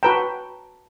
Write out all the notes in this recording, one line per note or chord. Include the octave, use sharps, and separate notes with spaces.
F#4 B4 G5 A5 A#5